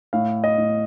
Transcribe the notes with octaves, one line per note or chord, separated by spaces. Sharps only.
A2 F5
D#5
A2